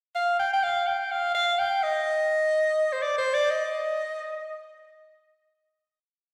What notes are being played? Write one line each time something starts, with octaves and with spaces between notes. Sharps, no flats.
F5
G5
G5
F5
G5
F5
F5
G5
D#5
C5
D5
C5
D5
D#5